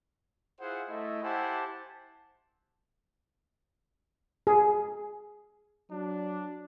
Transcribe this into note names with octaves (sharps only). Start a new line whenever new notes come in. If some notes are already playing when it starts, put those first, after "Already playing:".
E4 F4 G#4 C5 F#5
A3 E4 D#5
E4 G4 C5 F#5 G#5 A5
G#4
F#3 D4